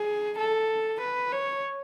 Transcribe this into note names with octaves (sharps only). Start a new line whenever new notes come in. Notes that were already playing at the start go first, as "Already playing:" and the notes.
Already playing: G#4
A4
B4
C#5